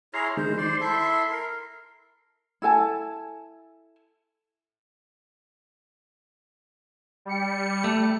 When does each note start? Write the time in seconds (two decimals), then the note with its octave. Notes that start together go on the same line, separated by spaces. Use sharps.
0.14 E4 G#4 C#5 A#5 C6 F6
0.37 D#3 G#3 C5
0.58 C5 D5 C6
0.81 E4 A4 E5
1.31 A#4
2.62 E4 A4 G#5 A5
7.25 G3 C#7
7.84 A3